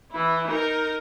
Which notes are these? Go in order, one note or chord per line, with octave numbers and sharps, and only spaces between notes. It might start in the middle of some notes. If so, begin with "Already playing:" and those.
E3 E4
D#4 A#4